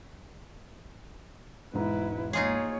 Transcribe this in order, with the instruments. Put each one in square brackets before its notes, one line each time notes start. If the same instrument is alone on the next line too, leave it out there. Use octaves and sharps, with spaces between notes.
[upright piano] E1 G#2 [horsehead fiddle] E4 B4
[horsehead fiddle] A#3 C#5 [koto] D#4 F4 G#4